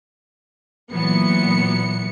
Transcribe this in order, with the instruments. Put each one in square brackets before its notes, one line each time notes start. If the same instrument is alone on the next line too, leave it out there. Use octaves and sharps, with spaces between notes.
[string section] A#2 E3 F#3 B3 C#7